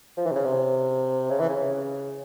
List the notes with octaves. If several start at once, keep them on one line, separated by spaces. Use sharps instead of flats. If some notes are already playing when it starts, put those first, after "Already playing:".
F3
E3
C3
C#3
C3
C#3
E3
C#3